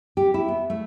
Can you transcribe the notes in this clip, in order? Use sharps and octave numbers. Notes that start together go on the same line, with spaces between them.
G4
E4
B3
A3